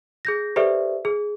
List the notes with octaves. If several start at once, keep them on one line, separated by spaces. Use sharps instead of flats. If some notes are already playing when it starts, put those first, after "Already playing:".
G#4 G6 A#6
G4 A4 B4 C5 D5 E5
G#4